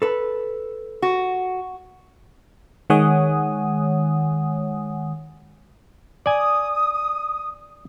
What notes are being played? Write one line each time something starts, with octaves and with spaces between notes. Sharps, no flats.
A4 B4
F#4
D#3 G#3 C#5 F#5 G#5 D#6
D5 G#5 D#6